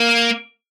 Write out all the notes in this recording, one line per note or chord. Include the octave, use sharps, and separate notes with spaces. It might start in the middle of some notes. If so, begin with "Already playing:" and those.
Already playing: A#3